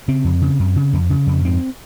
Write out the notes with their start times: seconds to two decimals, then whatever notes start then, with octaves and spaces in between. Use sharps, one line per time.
0.08 C#3 C4
0.24 F2
0.41 C#3
0.59 F#2
0.76 C#3
0.93 F2
1.10 C#3
1.27 F2
1.45 G#2 C4